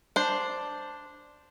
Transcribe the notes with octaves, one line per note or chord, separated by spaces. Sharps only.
D4 C5